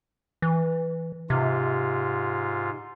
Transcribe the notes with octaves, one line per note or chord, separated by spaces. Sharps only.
E3
G#2 C3 F4